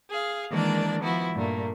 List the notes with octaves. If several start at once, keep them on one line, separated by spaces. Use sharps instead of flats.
G#4 F5
D#3 E3 G#3 A#3 D4 D5
F3 B3 E4 F#4
G2 A#2 A3 A#3